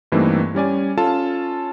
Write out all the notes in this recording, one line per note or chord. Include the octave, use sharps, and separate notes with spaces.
G2 E3 A3 A#3 C4 D#4
G3 C#4 D5 G#5
C#4 F4 A4 A5